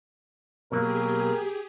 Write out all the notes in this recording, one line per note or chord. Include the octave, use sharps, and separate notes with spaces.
B2 F#3 A#3 G4 G#4 A#4